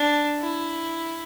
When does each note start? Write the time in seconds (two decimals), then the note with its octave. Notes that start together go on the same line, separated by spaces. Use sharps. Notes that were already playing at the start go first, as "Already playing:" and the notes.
Already playing: D4
0.40 E4